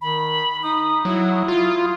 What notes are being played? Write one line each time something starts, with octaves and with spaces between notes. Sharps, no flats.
D#3 B5
D#4 D#6
F#3 E4 D#6
F4